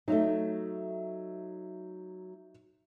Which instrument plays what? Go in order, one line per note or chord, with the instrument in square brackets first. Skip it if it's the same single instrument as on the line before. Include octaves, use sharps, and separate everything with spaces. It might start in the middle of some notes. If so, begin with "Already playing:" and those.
[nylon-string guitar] F#3 A3 [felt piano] D#4 E5